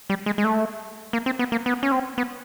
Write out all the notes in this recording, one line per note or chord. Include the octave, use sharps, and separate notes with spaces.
G3
G#3
G#3
A3
A#3
C4
B3
A#3
B3
C#4
C4
B3